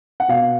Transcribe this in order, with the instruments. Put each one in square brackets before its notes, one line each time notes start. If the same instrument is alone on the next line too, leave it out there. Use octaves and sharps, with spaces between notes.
[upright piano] F#5
B2 F5